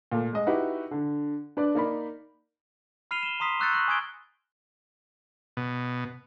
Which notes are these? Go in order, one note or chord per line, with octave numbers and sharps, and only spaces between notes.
A#2 A3
G#3 D#5
D#4 E4 F#4 G4 B4
D3
D4 B4 D5
A#3 D#4 D5 B5
B5 F6 C7 D#7 F7 G7
E7 G7
A#5 C6 D#6 B6 C7
C#6 E6 F#6 G6 A6 C#7
C#6 F#6 A6 A#6 F#7
G#5 D#6 F6 G#6 D7 G7
B2